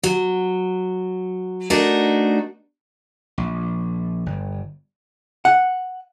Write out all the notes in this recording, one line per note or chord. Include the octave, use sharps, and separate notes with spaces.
F#3
A3 D4 D#4 F#4 A#4
A#1
G1
F#5